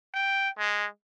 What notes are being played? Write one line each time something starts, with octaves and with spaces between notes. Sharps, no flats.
G5
G#3